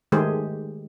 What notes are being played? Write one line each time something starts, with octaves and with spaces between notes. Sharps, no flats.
D#3 G#3 A3 G4 G#4 C5